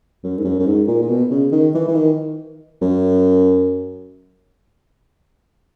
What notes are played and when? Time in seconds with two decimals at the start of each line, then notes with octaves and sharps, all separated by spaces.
0.23 F#2
0.37 G#2
0.45 F#2
0.59 F#2
0.66 G#2
0.88 A#2
1.02 A#2
1.09 B2
1.30 C#3
1.52 D#3
1.74 E3
1.88 E3
1.95 D#3
2.82 F#2